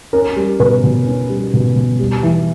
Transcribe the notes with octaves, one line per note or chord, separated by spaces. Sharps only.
C#4 A#4
G3
B2 B4
B2
C#4
G3
B2
B2
G3
E3